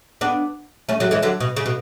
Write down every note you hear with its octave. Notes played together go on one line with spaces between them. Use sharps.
B3 D4
A3 C#4
F#3 A3
E3 G#3
D3 F#3
B2
C#3
B2